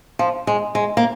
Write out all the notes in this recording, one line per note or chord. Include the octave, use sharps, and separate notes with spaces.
F3
G#3
G#3
A#3